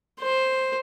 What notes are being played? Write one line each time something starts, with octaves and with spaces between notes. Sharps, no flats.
C5